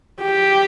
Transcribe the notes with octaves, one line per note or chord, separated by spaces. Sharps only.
G4